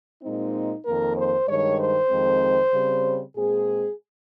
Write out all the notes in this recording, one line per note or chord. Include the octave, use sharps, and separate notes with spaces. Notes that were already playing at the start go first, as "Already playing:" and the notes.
A#2 G#3 C4 D#4
F2 D#3 A#3 A#4
C5
G2 D#3 G#3 C#5
C5
F2 D#3 G#3 C4
C#3 G3 C4
A#2 G#3 C4 G#4